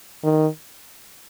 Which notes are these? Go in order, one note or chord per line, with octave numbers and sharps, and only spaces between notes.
D#3